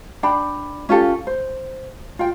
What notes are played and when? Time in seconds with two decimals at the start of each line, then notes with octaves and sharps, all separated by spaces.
0.23 D4 G5 B5
0.89 C#4 F4 G4 A4
1.27 C5
2.19 F4 G5